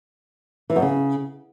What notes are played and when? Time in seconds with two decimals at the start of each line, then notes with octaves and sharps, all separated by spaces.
0.70 E3
0.76 F#2
0.82 C#3